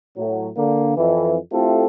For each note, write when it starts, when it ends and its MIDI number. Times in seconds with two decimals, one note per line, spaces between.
0.17 0.47 45
0.17 0.47 54
0.56 0.92 50
0.56 0.92 58
0.96 1.37 41
0.96 1.37 52
1.52 1.86 57
1.52 1.86 60
1.52 1.86 64
1.52 1.86 65
1.52 1.86 67
1.52 1.86 69